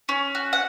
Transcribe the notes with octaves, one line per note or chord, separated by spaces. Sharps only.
C#4
F#4
F#5